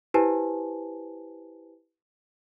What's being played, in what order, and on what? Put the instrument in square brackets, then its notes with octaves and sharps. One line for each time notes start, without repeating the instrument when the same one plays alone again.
[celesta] E4 G4 B4 C5 G#5 A5